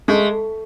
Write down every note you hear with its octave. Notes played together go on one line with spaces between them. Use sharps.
G#3 A3